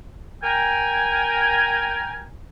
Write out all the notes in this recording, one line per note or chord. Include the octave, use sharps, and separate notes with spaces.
A#4 G5 G#5